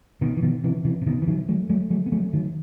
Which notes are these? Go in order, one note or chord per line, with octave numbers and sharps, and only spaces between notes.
B2 D#3
E3
B2 D#3
C3 E3
C3 E3
C3
B2 D#3
E3
D#3 F#3
F#3 A3
F#3 A3
F#3 A3
B3
F#3 A3
D#3 F#3